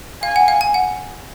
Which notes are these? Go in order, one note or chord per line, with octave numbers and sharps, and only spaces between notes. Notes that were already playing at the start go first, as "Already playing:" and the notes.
F5 G#5
F#5
F5
G#5
F#5